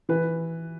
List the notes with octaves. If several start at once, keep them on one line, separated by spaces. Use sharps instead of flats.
E3 B4